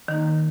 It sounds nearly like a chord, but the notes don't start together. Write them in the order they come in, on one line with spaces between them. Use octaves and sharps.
D#3 D#4 A#3